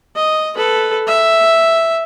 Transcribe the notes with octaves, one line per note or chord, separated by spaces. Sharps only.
D#5
A4 B4
E5